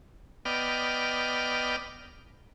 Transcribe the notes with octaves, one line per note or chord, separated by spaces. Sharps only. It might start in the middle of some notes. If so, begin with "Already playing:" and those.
B3 D5 D#5 G5 F6